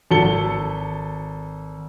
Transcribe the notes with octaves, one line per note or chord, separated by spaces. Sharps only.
G#1 A4 C#7 G7